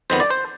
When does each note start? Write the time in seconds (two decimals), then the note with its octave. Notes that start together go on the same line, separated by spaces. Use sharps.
0.10 F2 D#3 B3 C5
0.20 D5
0.30 C5